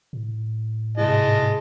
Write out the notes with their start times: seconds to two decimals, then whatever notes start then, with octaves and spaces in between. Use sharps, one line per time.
0.13 A2
0.97 G#2 C3 G#3 E4 D#5 A5